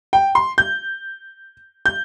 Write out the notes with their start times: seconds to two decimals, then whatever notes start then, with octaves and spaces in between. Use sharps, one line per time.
0.13 G5
0.35 C6
0.58 G6
1.86 G6